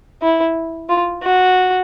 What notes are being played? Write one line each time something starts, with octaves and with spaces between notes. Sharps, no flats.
E4
F4
F#4